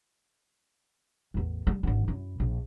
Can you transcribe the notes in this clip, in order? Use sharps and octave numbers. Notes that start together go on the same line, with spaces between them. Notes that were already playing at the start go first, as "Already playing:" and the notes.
A1 E2
G3 A3
G#1 D3
F#2 E4
A#1